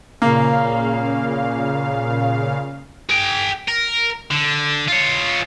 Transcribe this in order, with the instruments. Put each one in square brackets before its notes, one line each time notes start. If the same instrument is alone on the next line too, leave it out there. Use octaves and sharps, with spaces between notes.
[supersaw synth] A#2 C#3 F5 [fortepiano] A#3
[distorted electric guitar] G#4 G5
A#4
D3
F4 C#5